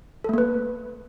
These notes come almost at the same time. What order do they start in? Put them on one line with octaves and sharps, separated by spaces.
A4 A3 A#3 B4